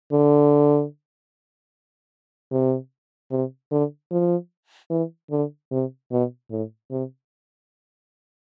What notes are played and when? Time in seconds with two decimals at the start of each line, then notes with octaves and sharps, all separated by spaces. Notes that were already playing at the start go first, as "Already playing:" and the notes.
0.12 D3
2.52 C3
3.31 C3
3.72 D3
4.12 F3
4.90 E3
5.31 D3
5.71 C3
6.11 B2
6.50 A2
6.91 C3